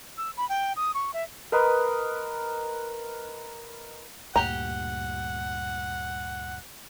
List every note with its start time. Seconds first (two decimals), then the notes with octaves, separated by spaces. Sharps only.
0.18 E6
0.37 B5
0.49 G5
0.76 D#6
0.95 C#6
1.14 E5
1.52 A#4 B4 D#5 C6
4.36 D2 G2 A#2 G4 F#5 A#5